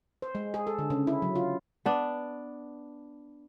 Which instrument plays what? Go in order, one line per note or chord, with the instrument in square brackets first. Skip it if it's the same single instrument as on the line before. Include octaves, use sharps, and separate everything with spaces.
[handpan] C5
G#3
G#4
A4
D3
C#3
E4
F#3
F4
[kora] B3 D4